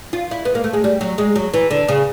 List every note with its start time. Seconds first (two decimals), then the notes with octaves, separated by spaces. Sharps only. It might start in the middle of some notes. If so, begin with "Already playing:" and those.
0.13 F4
0.31 E4
0.45 B3
0.55 A#3
0.64 A3
0.73 G#3
0.84 G3
1.01 F#3
1.18 G#3
1.36 F#3
1.54 E3
1.71 D3
1.88 C#3